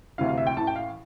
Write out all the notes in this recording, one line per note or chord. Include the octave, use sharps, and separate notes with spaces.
D2 C3 E3 F5
F5
E5
G5
A1 A2 E3 A5
G5
F5